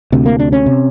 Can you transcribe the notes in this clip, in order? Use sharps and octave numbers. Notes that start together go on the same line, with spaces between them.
D2 C3
A#3
D4
C#4
C3